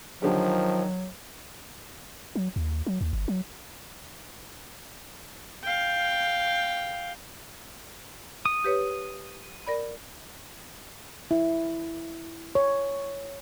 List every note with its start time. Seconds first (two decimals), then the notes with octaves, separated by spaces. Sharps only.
0.22 D3 D#3 F3 F#3 G4
2.35 F#3
2.56 D#2
2.86 F#3
3.01 D#2
3.13 G1
3.28 F#3
5.64 F5 G5
8.46 D#6
8.64 G4 B4 C#5
9.67 A#4 D5 B5
11.31 E4
12.55 C#5